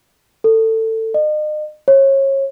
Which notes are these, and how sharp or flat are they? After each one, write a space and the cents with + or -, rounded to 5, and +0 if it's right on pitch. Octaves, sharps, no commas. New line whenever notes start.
A4 +20
D#5 -40
C#5 -30